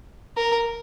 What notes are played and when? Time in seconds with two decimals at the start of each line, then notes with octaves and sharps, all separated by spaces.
0.37 A#4